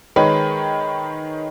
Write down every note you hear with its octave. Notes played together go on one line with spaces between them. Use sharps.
D#3 G#3 B4 C#5